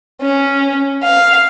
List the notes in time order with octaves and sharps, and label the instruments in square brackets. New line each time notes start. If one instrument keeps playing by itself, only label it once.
[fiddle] C#4
F5